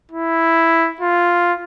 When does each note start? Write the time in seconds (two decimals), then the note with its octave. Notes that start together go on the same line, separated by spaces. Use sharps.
0.12 E4
1.01 F4